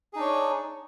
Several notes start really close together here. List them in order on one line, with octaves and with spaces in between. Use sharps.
G#4 D#4 D4 C#5